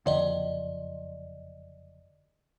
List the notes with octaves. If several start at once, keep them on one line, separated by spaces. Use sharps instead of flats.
F#1 F2 D3 D5 D#5